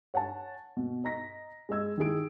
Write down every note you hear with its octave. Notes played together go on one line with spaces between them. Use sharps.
C#5 F#5 G#5 A5
B2
D#5 A#5 A#6 B6
G#3 G#4 D#5 E6 G#6
D#3 E4 G#4 D7